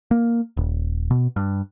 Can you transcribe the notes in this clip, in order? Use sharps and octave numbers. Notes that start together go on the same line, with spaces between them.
A#3
D#1
B2
G2